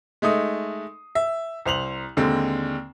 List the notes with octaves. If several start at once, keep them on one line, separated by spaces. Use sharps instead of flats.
G#3 A3 D#4 D#6
E5
C2 C5 F7 F#7
D#2 D3 G#3 C4